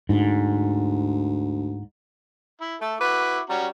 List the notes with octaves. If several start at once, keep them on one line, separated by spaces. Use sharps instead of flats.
D2 G#2
E4
A3 A4
E4 F#4 B4 D6
G3 C#4 F#4 A#5